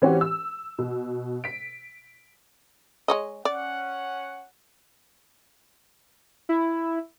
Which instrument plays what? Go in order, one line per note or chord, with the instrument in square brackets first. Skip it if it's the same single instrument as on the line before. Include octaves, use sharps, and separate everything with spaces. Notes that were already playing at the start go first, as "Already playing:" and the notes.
[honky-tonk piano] E3 C4 C#4 F#4 G4
E6
B2
B6 D7
[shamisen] G#3 C#5 D#5
[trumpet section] C#4 F#5 [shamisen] D5
[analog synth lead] E4